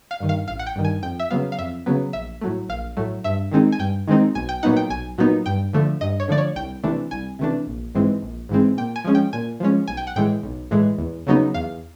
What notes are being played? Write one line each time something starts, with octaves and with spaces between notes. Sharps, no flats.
F5
G2 D#3
F5
A1 F5
F#5
G5
G2 D#3
G#5
F2 G5
E5
C#3 F#3 B3 F5
F5
F2 E5
C#3 F#3 B3
A#1 E5
A2 F#3 A3
A#1 F5
A2 F#3 A3
G2 E5
D#3 G#3 C4 D#4
G#5
G2 G5
D#3 G#3 C4 D#4
B1 G#5
G5
A#2 F#3 B3 D#4 F#5
G5
B1 G#5
A#2 F#3 B3 D#4
G2 G5
D3 F3 A3
G2 D#5
C#5
D3 F3 A3 D5
C#5
C2 G5
C3 E3 A3 D4
C2 G#5
C3 E3 A3 D4
A#1
G#2 E3 G#3 C4
A#1
G#2 E3 G#3 C4
A#2 G5
G#5
F3 G#3 C#4
G5
A#2 G#5
F3 G#3 C#4
B1 G#5
G5
F#5
A2 E3 G#3 G5
B1
A2 E3 G#3
E2
C#3 F#3 B3 D#4
E2 F5